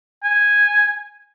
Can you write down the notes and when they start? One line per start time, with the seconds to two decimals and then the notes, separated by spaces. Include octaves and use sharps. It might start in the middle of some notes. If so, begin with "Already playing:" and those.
0.24 G#5